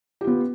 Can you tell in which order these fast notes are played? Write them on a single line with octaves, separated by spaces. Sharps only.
G4 F4 B3